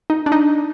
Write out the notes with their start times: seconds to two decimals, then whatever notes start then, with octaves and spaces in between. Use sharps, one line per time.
0.10 D#4
0.26 D4
0.32 D#4